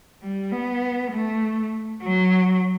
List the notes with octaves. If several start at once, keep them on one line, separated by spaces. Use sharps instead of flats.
G3
B3
A3
F#3